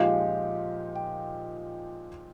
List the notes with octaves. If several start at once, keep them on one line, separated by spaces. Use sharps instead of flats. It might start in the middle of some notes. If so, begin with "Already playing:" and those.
Already playing: A#2 F3 G#3 D#4 G4 F5
G5